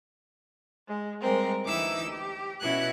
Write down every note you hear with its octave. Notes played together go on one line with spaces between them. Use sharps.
G#3
G3 G#3 C4 A#4
D2 E3 D#4 E4 D6 E6
G4
B2 C#4 E4 F#4 F#6 G#6